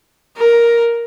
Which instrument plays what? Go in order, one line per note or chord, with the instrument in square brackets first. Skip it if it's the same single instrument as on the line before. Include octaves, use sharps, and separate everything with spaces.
[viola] A#4